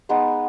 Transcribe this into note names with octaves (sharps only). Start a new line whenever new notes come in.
G#3 B3 D#4